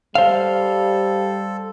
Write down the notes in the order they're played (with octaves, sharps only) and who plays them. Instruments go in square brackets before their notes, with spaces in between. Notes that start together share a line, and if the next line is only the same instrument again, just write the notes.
[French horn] G3 [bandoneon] A4 [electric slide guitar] C5 F5